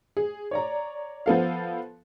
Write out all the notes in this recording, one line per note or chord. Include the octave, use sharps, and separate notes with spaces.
G#4
C#5 D5 A#5
F3 B3 A4 F5